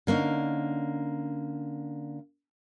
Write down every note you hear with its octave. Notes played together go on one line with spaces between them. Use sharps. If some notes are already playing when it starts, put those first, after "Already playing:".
D3 A#3 C#4 D#4